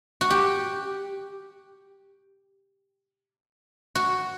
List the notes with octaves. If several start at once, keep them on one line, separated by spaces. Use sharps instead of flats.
F#4
G4
F#4